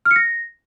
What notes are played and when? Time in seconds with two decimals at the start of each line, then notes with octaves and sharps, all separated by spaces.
0.05 F6
0.11 C#7
0.16 A#6